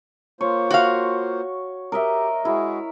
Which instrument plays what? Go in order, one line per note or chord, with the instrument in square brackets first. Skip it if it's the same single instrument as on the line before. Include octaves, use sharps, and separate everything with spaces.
[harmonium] A#3 F4 C5 [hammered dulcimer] C#5
[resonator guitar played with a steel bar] F#4 F5
[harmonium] G4 [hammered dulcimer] A#4 D#5 E5
[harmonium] G#3 F#4 G#4 [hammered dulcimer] E4